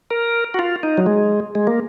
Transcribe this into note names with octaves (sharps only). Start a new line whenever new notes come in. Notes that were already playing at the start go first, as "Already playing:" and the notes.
A#4
F#4
F4
D#4
F#3
G#3
G#3
A#3